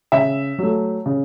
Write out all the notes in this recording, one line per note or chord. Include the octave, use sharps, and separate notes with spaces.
C#3 E5
F#3 A3
C#3